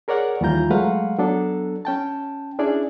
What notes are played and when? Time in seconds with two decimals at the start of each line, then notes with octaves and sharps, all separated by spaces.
0.08 G#4 A#4 C#5 D5 F#5
0.41 D#2 E3 G3 F4 A#5 G6
0.70 F#3 G#3 A3 B4 F5 F#5
1.18 F#3 B3 D4 A4
1.85 C#4 G5 A5
2.59 C#4 D4 E4 G#4 D5